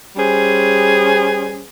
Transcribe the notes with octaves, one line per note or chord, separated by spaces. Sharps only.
G3 C#4 G#4 C5